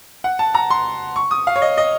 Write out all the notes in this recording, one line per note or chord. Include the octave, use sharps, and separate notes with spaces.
F#5
A5
A#5
C6
C#6
D#6
F5
C#5
D#5
D#5